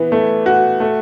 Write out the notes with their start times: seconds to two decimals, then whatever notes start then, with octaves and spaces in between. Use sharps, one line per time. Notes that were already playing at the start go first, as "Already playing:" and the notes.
Already playing: E3 B3
0.12 A3
0.46 F#4
0.80 A3